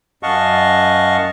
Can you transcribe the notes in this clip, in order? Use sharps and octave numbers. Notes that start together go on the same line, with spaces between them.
F#2 D#5 F5 F#5 A5 C#6